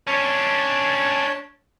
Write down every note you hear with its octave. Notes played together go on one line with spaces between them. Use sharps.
C#4 D4 C#5 A5